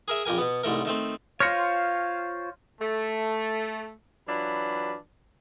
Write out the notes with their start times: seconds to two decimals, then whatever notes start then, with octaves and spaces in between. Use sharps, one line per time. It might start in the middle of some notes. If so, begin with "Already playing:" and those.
0.08 G#4 A#4 E5
0.25 A#1 F2 G4 A#4 G#5
0.38 B2 B3
0.63 C2 G#2 A3 A#4
0.85 D#3 A3 C4
1.40 F4 C5 C#5 F5 F6 A#6 C#7
2.81 A3
4.28 E3 F#3 D4 F4 B5